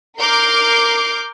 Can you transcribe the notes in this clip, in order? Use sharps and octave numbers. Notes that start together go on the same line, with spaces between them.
A#4 D6 F6 G6 C7